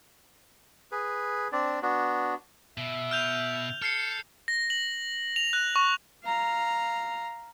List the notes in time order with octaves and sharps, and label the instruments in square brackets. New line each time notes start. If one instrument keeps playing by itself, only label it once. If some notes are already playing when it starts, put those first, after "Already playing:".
[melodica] G#4 B4
C4 D4 D5
B3 D4 F#4
[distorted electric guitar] B2 [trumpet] E5
[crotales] F6 G6 F7
[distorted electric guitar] A4 [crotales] F6 C7 C#7
[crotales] A#6
F#7
F7
F#6
C#6
[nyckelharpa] F5 A#5